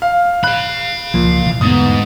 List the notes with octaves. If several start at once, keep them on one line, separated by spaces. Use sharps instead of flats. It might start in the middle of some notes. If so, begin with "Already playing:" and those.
F5
F5 B5 F#6
C#2 A#2 F3
B2 E3 F3
E2 G#2 D3 A3 B3 D#6